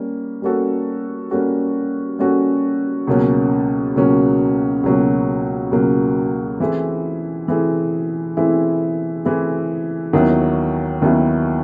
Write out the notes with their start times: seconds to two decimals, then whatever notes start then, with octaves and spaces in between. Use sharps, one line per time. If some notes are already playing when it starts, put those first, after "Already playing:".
Already playing: G3 A#3 C#4
0.42 G3 A#3 C#4 F#4 A4
1.31 G3 A#3 C#4 F#4 A4
2.19 G3 A#3 C#4 F#4 A4
3.07 C#2 B2 F#3 A#3 C#4
3.96 C#2 B2 F#3 A#3 C#4
4.83 C#2 B2 F#3 A#3 C#4
5.71 C#2 B2 F#3 A#3 C#4
6.60 E3 A3 C4 E4 G#4
7.48 E3 A3 C4 E4 G#4
8.37 E3 A3 C4 E4 G#4
9.25 E3 A3 C4 E4 G#4
10.13 D#2 D#3 F#3 B3 E4
11.02 D#2 D#3 F#3 B3 E4